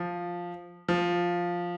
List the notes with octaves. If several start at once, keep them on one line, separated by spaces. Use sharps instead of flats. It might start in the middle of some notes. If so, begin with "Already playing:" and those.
Already playing: F3
F3